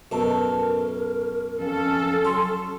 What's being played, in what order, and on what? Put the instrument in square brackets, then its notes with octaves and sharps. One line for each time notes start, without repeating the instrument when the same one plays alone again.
[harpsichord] F#2 B2 [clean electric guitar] A4 [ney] A#4
[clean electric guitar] F2 [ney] C#4 [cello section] A4
[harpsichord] F#3 [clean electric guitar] C6